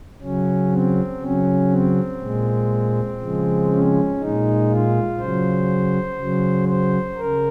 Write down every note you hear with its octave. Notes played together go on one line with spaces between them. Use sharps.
C#3 F#3 C#4
C4
C#3 F#3 C#4
C4
A#2 G#3
C#3 F3 G#3
C#4
A#2 G#3 D#4
F4
C#3 F#3 C5
C#3 F#3
C5
C#3 A#4